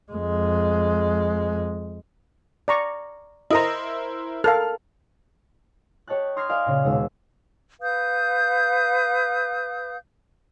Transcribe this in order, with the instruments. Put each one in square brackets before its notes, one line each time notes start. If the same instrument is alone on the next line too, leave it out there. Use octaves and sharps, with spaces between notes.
[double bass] F2 G#3
[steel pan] D5 A#5 C#6
[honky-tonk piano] E4 A#4 C5 [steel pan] D#5 A#5
[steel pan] A4 A#4 F5 [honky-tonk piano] F6
[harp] G4 C#5 D#5 A5 F#6
C6 D#6 F6 G#6 A#6 C7
A#4 D5 D#5 F5 G#5
A#2 C#3
D#2 B2 G#3 E6
[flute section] B4 F5 D#6 G6